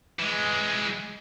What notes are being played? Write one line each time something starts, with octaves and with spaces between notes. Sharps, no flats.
E3 G#3